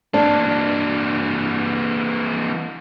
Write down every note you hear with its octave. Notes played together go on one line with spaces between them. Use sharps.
E3 A#3 D4